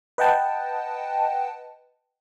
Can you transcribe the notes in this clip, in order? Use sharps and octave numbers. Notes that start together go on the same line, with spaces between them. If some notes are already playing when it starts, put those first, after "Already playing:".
B4 D#5 F#5 G5 A5